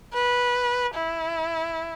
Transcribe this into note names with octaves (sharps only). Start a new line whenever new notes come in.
B4
E4